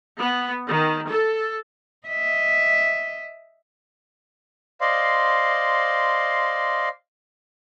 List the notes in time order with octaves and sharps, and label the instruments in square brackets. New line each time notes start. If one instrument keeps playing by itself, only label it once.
[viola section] B3
D#3
A4
[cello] D#5 E5
[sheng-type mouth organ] C5 D5 D#5 F5 C6